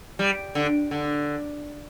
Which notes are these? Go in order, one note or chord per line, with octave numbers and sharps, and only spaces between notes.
G3
D3
D3